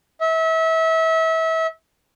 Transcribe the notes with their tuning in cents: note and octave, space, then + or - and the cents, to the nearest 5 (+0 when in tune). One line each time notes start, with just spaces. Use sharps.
E5 -30